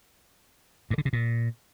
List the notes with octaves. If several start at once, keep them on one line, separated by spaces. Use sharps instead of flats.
G2
D3
C3
A#2